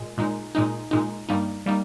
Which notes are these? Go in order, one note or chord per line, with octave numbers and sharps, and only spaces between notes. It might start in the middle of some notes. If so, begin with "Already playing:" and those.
Already playing: A#2 G#3
A#2 G#3 D#4
A#2 G#3 D#4
A#2 G#3 D#4
G2 G3 A#3 D#4
G3 A#3 D#4